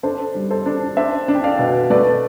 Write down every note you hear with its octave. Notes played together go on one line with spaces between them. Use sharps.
D4 A4 C5
G3
A4 C5
D4
D4 C5 E5
D4
G5
D5 F5
B2
A3 B4 D5